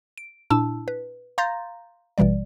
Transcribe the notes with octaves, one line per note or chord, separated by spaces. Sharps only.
D7
A#2 D4 E4 A5 E6
B4
F5 A#5 C6 G6 A6 A#6
A1 B2 E3 G3 D5